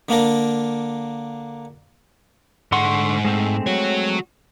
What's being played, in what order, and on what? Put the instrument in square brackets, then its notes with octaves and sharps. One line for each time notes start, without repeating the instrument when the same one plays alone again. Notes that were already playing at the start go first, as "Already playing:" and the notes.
[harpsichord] D3 A#3 D4 A#4
[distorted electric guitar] G#2 F#5 [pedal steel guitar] D3 C6 C#6
[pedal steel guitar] G#3 A3 C4
[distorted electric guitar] F#4 C#5